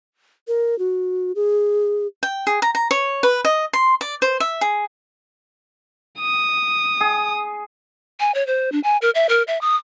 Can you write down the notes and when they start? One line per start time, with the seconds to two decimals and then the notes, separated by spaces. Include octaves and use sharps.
0.48 A#4
0.79 F#4
1.35 G#4
2.23 G5
2.47 G#4
2.62 A#5
2.75 A#5
2.91 C#5
3.23 B4
3.45 D#5
3.73 C6
4.01 D5
4.22 C5
4.40 E5
4.61 G#4
6.19 D#6
7.01 G#4
8.20 G#5
8.35 C#5
8.47 C5
8.72 D4
8.84 G#5
9.02 A#4
9.15 E5
9.29 A#4
9.48 E5
9.61 D#6